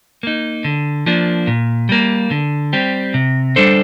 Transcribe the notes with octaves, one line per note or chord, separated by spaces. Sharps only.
A#3 D#4
D3
F3 A#3 D4
A#2
G3 A#3
D3
G3 C4 G4
C3
G3 D4 A4 C5